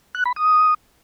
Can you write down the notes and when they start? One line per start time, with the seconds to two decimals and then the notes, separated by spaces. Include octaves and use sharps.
0.15 F#6
0.25 B5
0.36 D#6